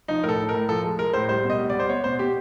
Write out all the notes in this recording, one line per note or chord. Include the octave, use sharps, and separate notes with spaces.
F3 D#4
A2 A#4
A4
A2
A#4
A2
F3 A4
G#3
G#3 A#4
A2 C5
G3 C5
B2
D#5
G3
B3 D5
C5
B3 C#5
B2 C5
B2 G4